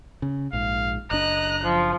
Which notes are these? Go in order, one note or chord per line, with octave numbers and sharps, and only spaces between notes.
C#3
A#1 G#2 F5
F#1 D4 D#5 A#5 F#6
F3